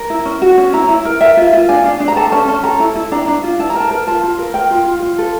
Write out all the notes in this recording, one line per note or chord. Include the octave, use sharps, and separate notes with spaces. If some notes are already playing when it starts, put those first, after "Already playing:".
Already playing: A#4
E4
C#4
F#4
C#4
E4 A#5
E4
A#4
A#4 E5
F4
F4
D4 G#5
D4
D4
A#5
A4 A5
C#4 A5
C#4 A5
A4 A#5
E4
E4
D4 A#5
D4
F4
E4 A5
A#5
A#4 A5
A#4
F4 A5
F4
A#4
A#4 G5
F4
F4
F4
A4